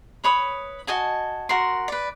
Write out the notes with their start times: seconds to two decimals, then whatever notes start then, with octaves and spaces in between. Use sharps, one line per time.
0.24 B4 C#5 B5 D#6
0.87 F#4 D#5 G#5 A5
1.49 F#4 A#4 F#5 C6
1.88 B4 D5